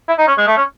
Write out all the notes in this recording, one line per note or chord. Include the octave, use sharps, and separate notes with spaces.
E4
D#4
C#4
G#3
A3
C#4